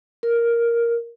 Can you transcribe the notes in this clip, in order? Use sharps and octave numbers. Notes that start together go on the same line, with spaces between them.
A#4